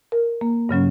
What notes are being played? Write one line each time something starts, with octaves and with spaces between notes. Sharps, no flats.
A#4
A#3
G2 C#3 F#3 C#4